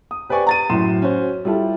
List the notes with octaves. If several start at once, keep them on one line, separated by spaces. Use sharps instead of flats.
D#6
G4 B4 C5 D5 G#5 C#6
A#5 A6 D#7
F#2 A2 F#4 C6 E7
C#4 F#4 C5
G3 E4 F4 A4